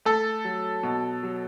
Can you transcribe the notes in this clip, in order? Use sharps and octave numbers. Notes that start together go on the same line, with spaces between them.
A3 A4
F#3
B2
F#3